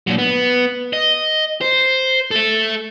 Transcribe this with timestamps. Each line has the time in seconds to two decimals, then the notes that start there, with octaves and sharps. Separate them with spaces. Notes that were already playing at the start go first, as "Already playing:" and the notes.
0.07 A#2 F#3
0.18 B3
0.93 D#5
1.61 C5
2.31 A4 E5